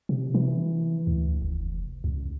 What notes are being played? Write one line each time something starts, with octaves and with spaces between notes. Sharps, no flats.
C3
E3
D2
F1
C#2